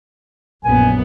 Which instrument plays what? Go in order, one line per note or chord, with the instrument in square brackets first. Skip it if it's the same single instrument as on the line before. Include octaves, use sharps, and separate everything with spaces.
[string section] A#1 F#2 B3 [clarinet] G#5